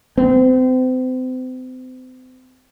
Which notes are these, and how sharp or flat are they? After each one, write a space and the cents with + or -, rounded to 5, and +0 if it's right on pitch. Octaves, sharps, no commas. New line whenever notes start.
C4 -35